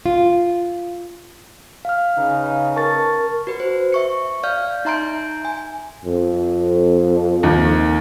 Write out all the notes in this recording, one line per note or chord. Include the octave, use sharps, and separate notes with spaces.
F4
F5 F6
C#3 D#4 B4
A#4 A5 C#6 A6
F#4 B4
C5
E5 C#6 C#7
D5 F5 F6 G6
D#4 E5 A#5 C6 G6 D7
G#5
F2
D#2 D#3